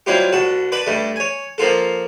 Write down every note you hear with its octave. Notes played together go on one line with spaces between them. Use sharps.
F#3 G3 C4 E4 F4 G4
C2 F#4 A5
B4 D5 A5 B5
G2 G3 A3
C#5 G#5
F3 A#3 F4 A4